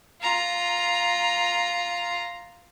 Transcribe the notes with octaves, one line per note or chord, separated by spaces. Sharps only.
F4 A#5